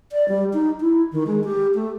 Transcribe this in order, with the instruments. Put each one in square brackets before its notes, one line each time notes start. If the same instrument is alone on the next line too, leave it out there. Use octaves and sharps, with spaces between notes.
[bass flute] D5
G3
D#4
E4
D#3
G#3
G4
A3